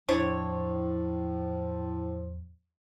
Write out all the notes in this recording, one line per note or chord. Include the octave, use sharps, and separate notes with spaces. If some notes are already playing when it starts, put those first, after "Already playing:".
E2 A2 F3 D4 E4 C#5